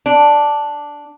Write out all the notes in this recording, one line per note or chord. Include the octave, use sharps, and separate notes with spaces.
D4